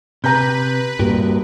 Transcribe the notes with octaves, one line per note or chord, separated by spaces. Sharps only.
C3 B4 A#5 G6
G2 A#2 F#4 G4 A#4